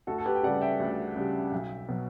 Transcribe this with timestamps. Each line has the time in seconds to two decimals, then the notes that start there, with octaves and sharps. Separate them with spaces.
0.07 D2 F#4 A4
0.18 A4
0.25 G4 B4
0.35 G5
0.43 C#3 G3 D5 F#5
0.61 E5 G5
0.80 D2
1.16 C#3 G3
1.52 B1
1.89 B2 F#3